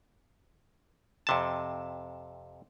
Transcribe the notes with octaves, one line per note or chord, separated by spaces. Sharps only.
F2 C3 A5